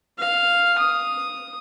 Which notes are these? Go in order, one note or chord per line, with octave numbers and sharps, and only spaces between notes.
F5
D#6